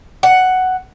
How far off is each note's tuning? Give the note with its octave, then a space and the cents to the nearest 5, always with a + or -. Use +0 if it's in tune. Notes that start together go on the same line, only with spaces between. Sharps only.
F#5 +5